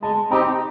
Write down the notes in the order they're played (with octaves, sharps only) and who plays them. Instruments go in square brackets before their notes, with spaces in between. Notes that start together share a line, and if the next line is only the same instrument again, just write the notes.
[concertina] G#3 [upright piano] A5
[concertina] C4 D#4 G4 [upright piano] A#5